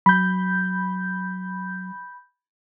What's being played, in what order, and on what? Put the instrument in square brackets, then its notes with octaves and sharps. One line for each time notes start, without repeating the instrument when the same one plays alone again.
[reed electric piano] F#3 [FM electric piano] B5 G6